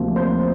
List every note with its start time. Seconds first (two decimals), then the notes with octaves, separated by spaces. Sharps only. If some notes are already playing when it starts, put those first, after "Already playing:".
Already playing: D2 C3 F3 A#3
0.16 C5